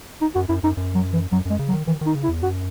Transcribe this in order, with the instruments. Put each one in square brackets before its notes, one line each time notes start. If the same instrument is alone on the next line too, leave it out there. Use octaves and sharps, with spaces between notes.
[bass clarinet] D#4
[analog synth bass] F#2 [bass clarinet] F#4
[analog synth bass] F#2 [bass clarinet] E4
[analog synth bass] F#2 [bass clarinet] D#4
[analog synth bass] F#2
[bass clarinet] F#3
E3
[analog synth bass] F#2 [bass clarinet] F#3
[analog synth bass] F#2 [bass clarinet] G#3
[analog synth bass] C#3
[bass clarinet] F#3
[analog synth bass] D#3
[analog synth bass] D#3 [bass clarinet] E3
[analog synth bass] D#3
[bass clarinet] D#4
[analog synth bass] C#3
[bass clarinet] E4
[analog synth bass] E2
[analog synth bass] F#2 [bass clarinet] F#4